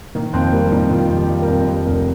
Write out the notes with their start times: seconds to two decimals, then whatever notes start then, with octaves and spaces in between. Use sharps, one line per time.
0.15 D#3 A#3
0.33 F2 C4
0.52 G3 A#3
0.72 F2 D#4
0.91 D#3 F4
1.10 F2
1.16 G4
1.29 G3
1.42 A#4
1.48 F2
1.67 F2
1.87 F1 A#4